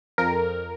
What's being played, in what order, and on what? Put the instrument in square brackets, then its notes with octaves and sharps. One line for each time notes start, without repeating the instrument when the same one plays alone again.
[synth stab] F2 A#4